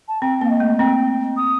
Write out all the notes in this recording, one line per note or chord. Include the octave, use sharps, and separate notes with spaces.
A5
C4 G5
A#3 F5
D#5
A3
C4 G5
D#6